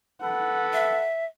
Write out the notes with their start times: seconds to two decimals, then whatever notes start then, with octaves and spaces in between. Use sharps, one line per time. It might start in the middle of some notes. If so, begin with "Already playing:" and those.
0.22 A4 B4 F#5
0.73 E5